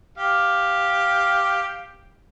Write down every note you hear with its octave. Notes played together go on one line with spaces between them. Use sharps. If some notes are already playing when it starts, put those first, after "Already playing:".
G4 F5